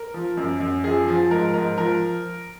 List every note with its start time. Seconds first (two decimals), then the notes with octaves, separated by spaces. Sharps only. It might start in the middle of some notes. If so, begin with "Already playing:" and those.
Already playing: A#4
0.14 F3
0.37 F#2
0.60 F#2
0.84 F3 G#4
1.08 F3
1.31 G#2 A#4
1.54 G#2 A#4
1.77 F3 A#4